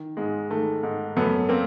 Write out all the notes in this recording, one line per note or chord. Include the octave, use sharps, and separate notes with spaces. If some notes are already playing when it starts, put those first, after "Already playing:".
Already playing: D#3
G#2 G#3
D#3 A3
G#2
F#2 A3 B3
A#3 C4